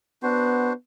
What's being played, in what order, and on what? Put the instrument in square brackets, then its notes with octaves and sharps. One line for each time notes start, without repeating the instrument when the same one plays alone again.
[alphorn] B3 [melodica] D4 F#4 C5